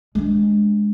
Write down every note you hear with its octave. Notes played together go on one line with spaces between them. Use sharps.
G#3 D4